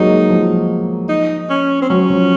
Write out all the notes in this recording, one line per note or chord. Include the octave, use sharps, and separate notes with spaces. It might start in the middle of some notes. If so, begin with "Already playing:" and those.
Already playing: F#3 G#3 A#3 D#4
F3
D#4
C#4
C4
F#3 C#4
F3